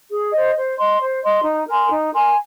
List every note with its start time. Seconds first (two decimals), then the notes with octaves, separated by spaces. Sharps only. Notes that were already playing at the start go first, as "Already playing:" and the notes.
0.10 G#4
0.32 C5 D#5
0.55 C5
0.77 D#5 C6
1.00 C5
1.22 D#5 C6
1.44 D#4
1.67 A#4 G#5 C6
1.89 D#4
2.12 A#4 G#5 C6